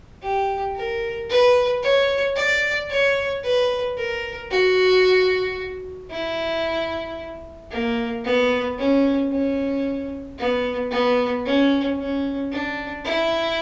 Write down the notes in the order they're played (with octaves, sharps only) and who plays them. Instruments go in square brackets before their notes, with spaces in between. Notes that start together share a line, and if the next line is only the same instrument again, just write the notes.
[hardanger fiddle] G4
A#4
B4
C#5
D5
C#5
B4
A#4
F#4
E4
A#3
B3
C#4
C#4
B3
B3
C#4
C#4
D4
E4